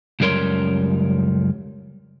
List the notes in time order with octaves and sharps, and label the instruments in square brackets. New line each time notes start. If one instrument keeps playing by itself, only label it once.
[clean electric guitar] C#2 F#2 G3 A#4 C#5 C6